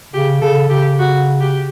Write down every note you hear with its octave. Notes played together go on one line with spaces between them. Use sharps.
C#3 G4
C#3 A4
C#3 G4
F#4
G4